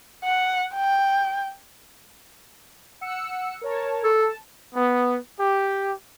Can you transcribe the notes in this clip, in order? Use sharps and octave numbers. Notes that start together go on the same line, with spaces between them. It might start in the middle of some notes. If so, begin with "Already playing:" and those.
F#5
G5
F#5 E6 C#7
A#4 C#5 A5
A4
A5
B3
G4